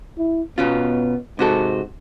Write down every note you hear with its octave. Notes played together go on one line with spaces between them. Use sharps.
E4
B2 B3 C#4 F4
G#2 C3 F#4 A4